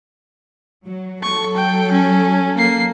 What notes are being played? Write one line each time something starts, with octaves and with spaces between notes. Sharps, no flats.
F#3
F#3 A4 C#6
G5
C#4
A#3 C7